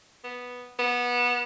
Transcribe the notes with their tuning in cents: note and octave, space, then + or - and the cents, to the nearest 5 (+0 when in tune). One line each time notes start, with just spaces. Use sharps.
B3 -5
B3 -20